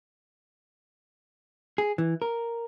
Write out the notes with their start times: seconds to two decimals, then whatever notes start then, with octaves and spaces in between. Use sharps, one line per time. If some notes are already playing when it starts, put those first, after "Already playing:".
1.78 G#4
1.98 E3
2.22 A#4